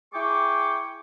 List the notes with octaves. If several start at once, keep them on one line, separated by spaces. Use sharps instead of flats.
E4 G#4 G5 C#6 D6